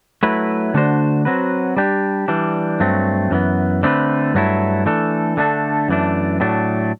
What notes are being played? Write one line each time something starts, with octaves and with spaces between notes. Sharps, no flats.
F#3 A3 E4 B4
D3 A3 D4 F#4 C5
F#3 C4 F#4 B4
G3 D4 G4
E3 G3 D4
G2 F#3 A3 C4
F#2 E3 B3
D3 A3 C4 G4 B4
G2 F#3 A3 E4
E3 A3 D4 A4
D3 A3 D4 A4
F#2 E3 A3 D4
A2 F#3 A3 D4